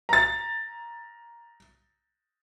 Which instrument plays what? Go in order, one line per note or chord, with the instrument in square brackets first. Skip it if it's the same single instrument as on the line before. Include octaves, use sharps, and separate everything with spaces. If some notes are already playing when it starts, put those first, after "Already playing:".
[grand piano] A#5 A6